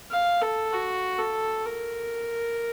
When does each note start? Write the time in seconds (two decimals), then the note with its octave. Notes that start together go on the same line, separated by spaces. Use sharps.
0.11 F5
0.42 A4
0.73 F#4
1.18 A4
1.66 A#4